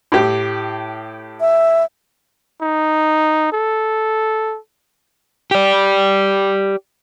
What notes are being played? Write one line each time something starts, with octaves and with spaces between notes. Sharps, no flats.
A2 G4
E5
D#4
A4
G4 D5